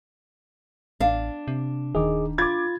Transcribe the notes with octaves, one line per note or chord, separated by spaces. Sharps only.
A1 D4 F5
C3
D#1 D#3 G#4 D#5 D6
F4 B5 D6 G#6 A6